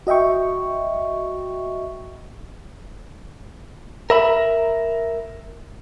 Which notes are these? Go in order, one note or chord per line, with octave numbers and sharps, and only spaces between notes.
F#4 D#5 E5 G5 C#6
A#4 E5 B5